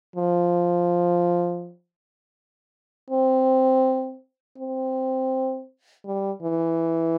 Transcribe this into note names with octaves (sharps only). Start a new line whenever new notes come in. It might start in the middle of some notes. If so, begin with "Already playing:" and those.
F3
C4
C4
G3
E3